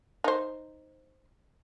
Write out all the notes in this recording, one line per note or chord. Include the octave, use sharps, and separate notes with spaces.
D#4 C5